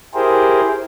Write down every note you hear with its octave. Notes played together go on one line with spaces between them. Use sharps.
E4 G4 G#4 A#4 C5